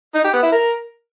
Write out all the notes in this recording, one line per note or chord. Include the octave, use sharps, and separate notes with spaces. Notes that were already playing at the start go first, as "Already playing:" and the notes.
D#4
G4
B3
E4
A#4